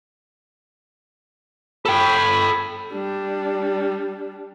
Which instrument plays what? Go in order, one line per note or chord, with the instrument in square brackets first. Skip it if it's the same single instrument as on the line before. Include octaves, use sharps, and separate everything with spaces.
[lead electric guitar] A4 G5 [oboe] B5
[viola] G3 D4